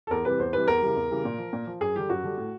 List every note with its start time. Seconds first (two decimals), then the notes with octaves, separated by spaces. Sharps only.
0.07 A4
0.11 E2 A#4
0.25 C3 E3 G3 B4
0.39 E2 C5
0.53 C3 E3 G3 B4
0.68 E2 A#4
0.82 C#3 E3 G3
0.96 E2
1.11 C#3 E3 G3
1.25 A#2
1.38 F3
1.53 A#2
1.67 F3
1.81 F#2 G#4
1.95 D3 G3 G4
2.09 F#2 F#4
2.23 D3 G3
2.38 A2